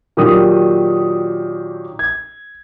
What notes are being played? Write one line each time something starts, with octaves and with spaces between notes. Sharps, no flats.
A#2 D#3 F#3 D4 G4 D#6
G#6